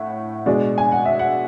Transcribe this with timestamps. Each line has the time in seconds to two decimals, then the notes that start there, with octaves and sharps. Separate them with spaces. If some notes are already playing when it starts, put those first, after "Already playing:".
Already playing: A2 E5 F#5
0.46 B2 G#3 D4
0.78 G#5
0.92 F#5
1.06 E5
1.19 F#5